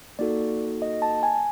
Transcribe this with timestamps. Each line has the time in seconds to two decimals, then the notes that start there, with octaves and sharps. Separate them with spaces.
0.19 A#3 D#4 F#4 A4 D5
0.82 D#5
1.02 A5
1.23 G#5